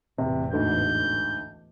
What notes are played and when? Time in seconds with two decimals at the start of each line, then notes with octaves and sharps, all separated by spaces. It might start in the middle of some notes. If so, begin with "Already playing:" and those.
0.18 A1 E2 C3
0.53 D2 G#2 D3 G6